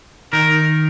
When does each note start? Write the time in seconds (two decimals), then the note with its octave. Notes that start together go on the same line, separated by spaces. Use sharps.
0.32 D#3 A#4